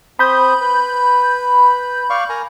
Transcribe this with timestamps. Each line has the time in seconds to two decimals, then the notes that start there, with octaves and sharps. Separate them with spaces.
0.19 C4 C5 B5 D#6 G6
0.61 B4
2.10 D5 F5 C#6
2.29 A#4 G#5 A#5